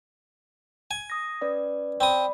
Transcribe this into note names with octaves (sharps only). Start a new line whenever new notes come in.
G#5
D#6 A#6
C#4 B4 D5
C4 D5 B5 D#6